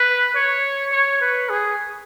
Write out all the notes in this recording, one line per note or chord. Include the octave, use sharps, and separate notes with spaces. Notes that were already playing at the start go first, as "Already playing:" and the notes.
Already playing: B4
C#5
C#5
B4
G#4